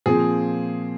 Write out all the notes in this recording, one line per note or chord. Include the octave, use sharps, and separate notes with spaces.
A#2 F3 C4 G#4